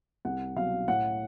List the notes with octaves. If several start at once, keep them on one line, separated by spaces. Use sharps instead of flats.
C2 F#5
B2 F#3 F5
A2 F#5